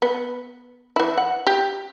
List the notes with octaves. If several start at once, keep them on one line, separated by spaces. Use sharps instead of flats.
B3
E3 E4
F#5
G4